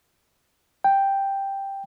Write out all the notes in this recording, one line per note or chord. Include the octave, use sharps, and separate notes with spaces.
G5